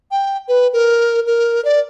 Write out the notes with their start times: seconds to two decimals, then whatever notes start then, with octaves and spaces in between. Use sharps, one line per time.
0.11 G5
0.48 B4
0.73 A#4
1.27 A#4
1.65 D5